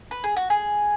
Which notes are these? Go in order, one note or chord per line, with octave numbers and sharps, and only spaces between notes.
B4
G#4
F#4
G#4